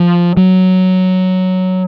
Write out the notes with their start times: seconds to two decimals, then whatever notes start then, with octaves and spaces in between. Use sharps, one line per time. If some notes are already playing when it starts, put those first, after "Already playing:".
Already playing: F3
0.37 F#3